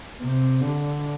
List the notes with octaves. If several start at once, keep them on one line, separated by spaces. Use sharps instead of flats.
C3
D3